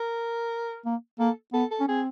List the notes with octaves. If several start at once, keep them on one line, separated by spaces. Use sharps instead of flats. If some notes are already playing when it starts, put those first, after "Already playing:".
Already playing: A#4
A#3
A#3 A4
B3 A4
A4
C#4
C4 G#4